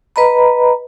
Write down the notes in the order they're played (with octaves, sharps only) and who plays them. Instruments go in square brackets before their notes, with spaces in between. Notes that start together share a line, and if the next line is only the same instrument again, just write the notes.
[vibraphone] B4 D#5 A#5 B5